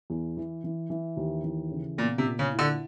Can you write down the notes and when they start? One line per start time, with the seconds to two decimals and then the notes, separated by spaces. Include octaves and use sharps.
0.10 E2
0.37 E3
0.64 E3
0.90 E3
1.17 D#2
1.44 E3
1.71 C#3
1.98 A#2 B3
2.18 C3
2.25 A#2
2.39 C#3
2.52 E4
2.59 D3